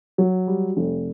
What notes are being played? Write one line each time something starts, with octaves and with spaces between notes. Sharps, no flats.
F#3
G3
F1